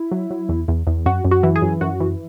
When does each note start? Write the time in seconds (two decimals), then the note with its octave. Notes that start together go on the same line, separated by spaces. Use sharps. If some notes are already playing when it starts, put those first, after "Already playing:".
Already playing: E4
0.11 F#3
0.31 F#3
0.49 E2
0.68 E2
0.87 E2
1.06 F#2 F#4
1.25 F#2
1.31 F#4
1.43 E3
1.56 G#4
1.62 F#2
1.81 F#2 F#4
2.01 E3